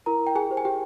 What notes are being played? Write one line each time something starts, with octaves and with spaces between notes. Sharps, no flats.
E4 A#4 A#5
G5
G#4 G#5
G4 C5
G#5
G4 G5